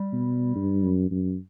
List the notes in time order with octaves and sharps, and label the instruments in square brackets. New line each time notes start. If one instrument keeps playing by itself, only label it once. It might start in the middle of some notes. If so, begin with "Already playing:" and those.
Already playing: [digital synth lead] G3
[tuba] B2
G2
F#2
F#2